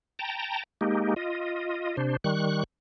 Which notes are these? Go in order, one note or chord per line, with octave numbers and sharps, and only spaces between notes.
G5 A5 A#5
G#3 A#3 D#4 G4
F4 D#5
C3 D4 C5
D#3 G3 C#6 F#6